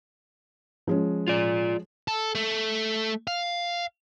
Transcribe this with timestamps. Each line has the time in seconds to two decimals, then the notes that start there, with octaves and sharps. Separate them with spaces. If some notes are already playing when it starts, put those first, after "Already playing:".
0.87 F3 G#3 C#4
1.28 F4 D5
2.08 A4
2.35 A3
3.27 F5